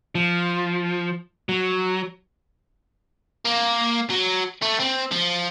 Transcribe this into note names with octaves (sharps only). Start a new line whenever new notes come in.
F3
F#3
A#3
F#3
A3
C4
F3